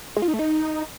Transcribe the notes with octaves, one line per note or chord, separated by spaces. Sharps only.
G#3
F4
D#4
A3
D#4